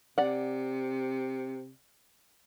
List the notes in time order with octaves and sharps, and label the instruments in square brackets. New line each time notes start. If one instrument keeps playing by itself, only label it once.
[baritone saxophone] C3 [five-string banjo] D5 F#5